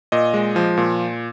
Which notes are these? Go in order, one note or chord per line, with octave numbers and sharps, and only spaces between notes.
A#2 D#5
G#3
F3
A#2